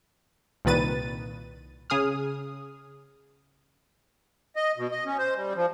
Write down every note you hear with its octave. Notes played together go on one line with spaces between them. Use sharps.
C2 A#2 D#3 B4 A6 D#7
C#3 G#4 D#6 F6
D#5
B2
D#5
C#4
C5
G3
F3